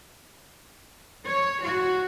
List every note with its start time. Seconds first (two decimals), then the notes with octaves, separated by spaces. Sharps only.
1.25 C#5
1.62 F#4